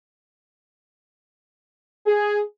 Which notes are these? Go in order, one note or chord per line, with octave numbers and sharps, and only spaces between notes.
G#4